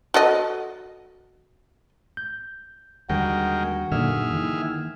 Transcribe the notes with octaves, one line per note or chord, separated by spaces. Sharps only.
F#4 A4 D#5
G6
D#2 D3 G3 G#3 F#4 A#4 G5
F#2 A#2 D3 D#3 A#3 G#4 E5 F6
D#3 E3